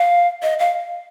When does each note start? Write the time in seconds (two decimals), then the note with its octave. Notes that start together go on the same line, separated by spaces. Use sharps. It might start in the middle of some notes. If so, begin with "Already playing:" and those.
Already playing: F5
0.43 D#5
0.59 F5